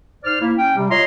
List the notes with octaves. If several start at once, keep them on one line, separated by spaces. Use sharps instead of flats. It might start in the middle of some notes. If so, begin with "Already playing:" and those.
G#2 C5 D5 F6
A#3 E4
C#4 G5
C3 G3
F4 C#5 D#5 A#5 C6